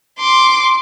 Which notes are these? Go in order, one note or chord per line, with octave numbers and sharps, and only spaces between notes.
C6 D6